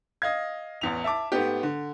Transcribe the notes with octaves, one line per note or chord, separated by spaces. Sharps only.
D#5 F5 G#6
A1 E2 F7
E5 A5 D6
G#2 A3 B3 G4
D3